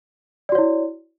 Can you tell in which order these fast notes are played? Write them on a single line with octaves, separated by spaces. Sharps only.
D5 F#4 C#5 E4